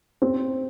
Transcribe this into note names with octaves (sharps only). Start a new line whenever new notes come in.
C4